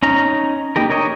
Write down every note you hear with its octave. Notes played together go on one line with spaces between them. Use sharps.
C#4 D#4 A#5
A#3 D#4 G4 A#4
D4 A#4 C#5 D#5